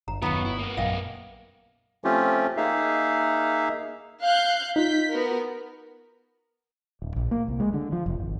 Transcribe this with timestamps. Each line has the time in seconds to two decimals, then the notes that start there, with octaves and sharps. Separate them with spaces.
0.08 G1 A#5
0.22 D#1 F#2 D#3 F#3 B3 F4 F#4 A#5
0.45 G1 E4
0.59 A#3 B3
0.77 A#1 F#2 D#5 F5 G5
2.04 F3 A3 C4 C#4 F4 G4
2.57 A#3 D#4 G#4 E5 F5
4.21 F5 F#6 G6
4.76 D#4 F4 G6 B6
5.11 B3 F#4 A#4
7.02 D1
7.16 A#1
7.31 A#3
7.48 C2
7.60 G#3
7.74 D3
7.92 F3
8.06 F1
8.20 G#1